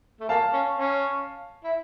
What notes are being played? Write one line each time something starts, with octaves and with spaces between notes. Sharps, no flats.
A3
A#3 F5 A5
C#4
C#4
E4